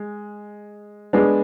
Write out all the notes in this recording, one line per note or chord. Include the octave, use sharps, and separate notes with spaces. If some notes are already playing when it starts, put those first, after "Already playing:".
Already playing: G#3
G#3 B3 D4